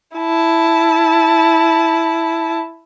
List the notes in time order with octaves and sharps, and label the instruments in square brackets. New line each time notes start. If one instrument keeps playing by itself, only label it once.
[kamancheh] E4 A5